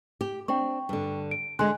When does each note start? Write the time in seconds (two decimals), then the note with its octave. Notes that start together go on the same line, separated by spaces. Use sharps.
0.21 G4
0.48 C4 D4 G5 C#6
0.89 G2 D3
1.31 D7
1.59 D3 G#3 G#5 C6 F#6